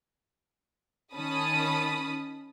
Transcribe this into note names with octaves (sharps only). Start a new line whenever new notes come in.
D#3 C#4 A5 B5 D#6